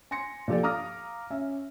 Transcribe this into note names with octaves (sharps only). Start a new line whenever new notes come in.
G#5 C6 A#6 C#7
A#2 F3 G4 A4 D5
F5 A#5 D6 D#6 F6 A#6
C#4 E5